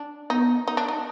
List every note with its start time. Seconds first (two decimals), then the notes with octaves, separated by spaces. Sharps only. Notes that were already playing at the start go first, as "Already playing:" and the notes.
Already playing: D4
0.30 B3 D#4
0.68 D#4
0.77 D4
0.88 D#4